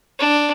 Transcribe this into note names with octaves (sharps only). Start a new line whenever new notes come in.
D4